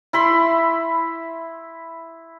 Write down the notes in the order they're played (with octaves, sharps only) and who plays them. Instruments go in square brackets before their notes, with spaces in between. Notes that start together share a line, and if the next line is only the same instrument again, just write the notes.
[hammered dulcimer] E4 B5 C6